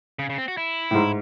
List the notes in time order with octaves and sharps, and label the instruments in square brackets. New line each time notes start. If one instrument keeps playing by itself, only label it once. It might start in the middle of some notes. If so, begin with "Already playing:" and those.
[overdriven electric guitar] C#3
C#3
C4
F#4
E4
[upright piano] A2
G#2